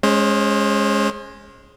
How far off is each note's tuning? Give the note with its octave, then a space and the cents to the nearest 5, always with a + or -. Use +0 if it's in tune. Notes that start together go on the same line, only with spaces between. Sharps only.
G#3 +0 C#4 +0 C5 +35